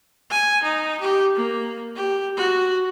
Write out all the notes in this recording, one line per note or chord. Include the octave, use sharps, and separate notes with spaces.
G#5
D#4
G4
A#3
G4
F#4